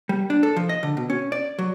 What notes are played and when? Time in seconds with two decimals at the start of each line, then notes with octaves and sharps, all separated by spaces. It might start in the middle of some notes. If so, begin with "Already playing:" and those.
0.09 G3
0.30 D4
0.43 A4
0.56 F3
0.69 D#5
0.83 D3
0.97 B2
1.10 C#4
1.32 D5
1.59 F#3